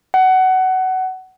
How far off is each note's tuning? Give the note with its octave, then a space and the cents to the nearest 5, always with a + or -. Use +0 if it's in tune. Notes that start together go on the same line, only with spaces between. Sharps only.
F#5 +20